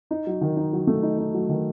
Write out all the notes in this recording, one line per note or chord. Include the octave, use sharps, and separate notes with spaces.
D#4
F#3
D#3
D#4
F#3
A3
D#4
D#4
F#3
D#3